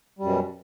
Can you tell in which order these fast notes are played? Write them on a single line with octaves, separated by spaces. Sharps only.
G3 F#2 B2